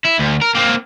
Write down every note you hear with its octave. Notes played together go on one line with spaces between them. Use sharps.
E4
D2
A#4
A#3 C4